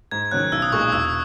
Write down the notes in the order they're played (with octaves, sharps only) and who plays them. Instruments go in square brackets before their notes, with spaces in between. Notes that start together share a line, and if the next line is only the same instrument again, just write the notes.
[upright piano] G#2 [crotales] G#6
[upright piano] D#3 F#3 C#4 [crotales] F#6
[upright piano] B1 [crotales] E6
[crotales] D#6
[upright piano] A#2 G#3 D#4 [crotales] C#6
[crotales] D#6
[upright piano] E1 [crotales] E6